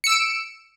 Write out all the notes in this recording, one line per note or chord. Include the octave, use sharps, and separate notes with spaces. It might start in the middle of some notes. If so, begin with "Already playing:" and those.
E6 C#7 D7 E7